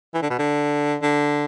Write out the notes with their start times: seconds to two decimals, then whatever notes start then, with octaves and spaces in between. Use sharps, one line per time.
0.14 E3
0.22 D3
0.30 B2
0.38 D3
1.02 D3